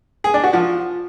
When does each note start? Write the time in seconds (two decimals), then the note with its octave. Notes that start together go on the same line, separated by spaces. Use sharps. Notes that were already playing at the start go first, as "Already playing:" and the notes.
0.24 G#4
0.34 D4
0.44 F#4
0.53 F3